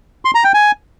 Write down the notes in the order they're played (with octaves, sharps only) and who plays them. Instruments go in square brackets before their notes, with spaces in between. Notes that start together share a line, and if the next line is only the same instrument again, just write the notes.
[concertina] C6
A#5
G5
G#5